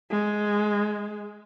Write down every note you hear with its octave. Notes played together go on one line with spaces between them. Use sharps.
G#3